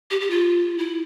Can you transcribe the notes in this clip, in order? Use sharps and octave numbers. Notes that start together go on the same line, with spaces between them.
G4
G4
F4
E4